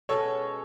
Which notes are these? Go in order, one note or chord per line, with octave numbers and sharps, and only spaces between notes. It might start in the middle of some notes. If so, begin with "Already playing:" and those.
B2 G#3 C#4 A4 C#5